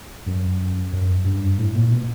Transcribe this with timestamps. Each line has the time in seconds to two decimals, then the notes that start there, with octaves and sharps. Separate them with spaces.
0.26 F#2
0.93 F#2
1.25 G2
1.58 A2
1.74 A#2
1.91 B2